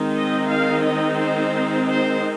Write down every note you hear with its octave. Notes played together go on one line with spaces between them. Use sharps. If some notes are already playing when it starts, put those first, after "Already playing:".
Already playing: D#3 G#3 C4 D#4
D#5
F5
D#5
C5
C5